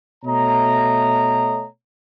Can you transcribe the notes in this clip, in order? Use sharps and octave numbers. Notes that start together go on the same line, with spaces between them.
B2 A3 C#5 D#5 A#5